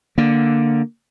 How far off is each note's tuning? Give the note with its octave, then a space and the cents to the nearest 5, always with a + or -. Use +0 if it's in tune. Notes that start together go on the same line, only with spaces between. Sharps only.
D3 +0 A#3 +0